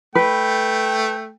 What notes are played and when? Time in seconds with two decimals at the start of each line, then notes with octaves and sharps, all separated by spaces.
0.15 A3 B4 G5